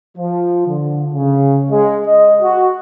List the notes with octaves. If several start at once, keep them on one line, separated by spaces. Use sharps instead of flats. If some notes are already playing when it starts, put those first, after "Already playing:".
F3
D3
C#3
G#3
D#5
F#4